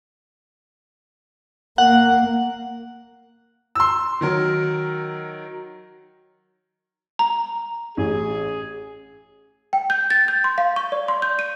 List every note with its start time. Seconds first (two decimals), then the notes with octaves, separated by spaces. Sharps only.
1.78 A#3 F#5
3.75 C6 E6
4.21 D#3 F#3 A#4
7.19 A#5
7.97 A1 G#4
9.73 G5
9.90 G6
10.10 A6
10.28 G6
10.44 C6
10.58 F5
10.76 C#6
10.92 D5
11.08 C6
11.22 G6
11.39 D#7